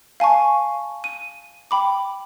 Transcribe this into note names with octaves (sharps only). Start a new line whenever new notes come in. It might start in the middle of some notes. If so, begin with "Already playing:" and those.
F5 G#5 A5 C#6
D#7
G5 B5 D6